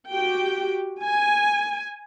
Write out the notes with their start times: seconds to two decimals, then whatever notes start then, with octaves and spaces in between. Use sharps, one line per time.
0.10 F#4 G4 G5
1.01 G#5